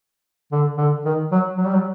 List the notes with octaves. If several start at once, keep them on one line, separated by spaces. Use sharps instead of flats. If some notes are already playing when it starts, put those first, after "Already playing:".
D3
D3
D#3
F#3
F#3
G3
F#3